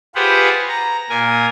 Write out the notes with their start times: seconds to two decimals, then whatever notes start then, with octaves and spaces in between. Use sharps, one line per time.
0.15 F4 G4 G#4 B4 C5 F#5
0.69 A#5
1.09 A#2 A#4 G#5